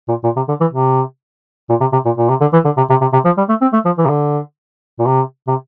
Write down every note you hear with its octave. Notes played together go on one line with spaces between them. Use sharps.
A#2
A#2
C3
D3
E3
C3
A#2
C3
C3
A#2
A#2
C3
D3
E3
D3
C3
C3
C3
C3
F3
G3
A3
C4
A3
F3
E3
C3
D3
A#2
C3
C3